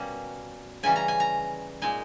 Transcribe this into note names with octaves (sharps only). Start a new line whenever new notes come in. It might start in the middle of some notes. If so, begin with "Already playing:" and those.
Already playing: B2 G3 A#3 C#4
C#3 E3 G3 C#4 G#5
A#5
G#5
A#5
A#2 G#3 D#4 G#5